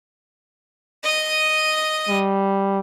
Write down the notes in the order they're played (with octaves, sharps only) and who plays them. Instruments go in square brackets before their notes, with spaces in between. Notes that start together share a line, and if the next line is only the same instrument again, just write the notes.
[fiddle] D#5 D#6
[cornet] G3